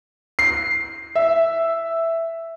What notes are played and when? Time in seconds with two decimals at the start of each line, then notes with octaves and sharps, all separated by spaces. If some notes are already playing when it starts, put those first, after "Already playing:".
0.39 C7
1.16 E5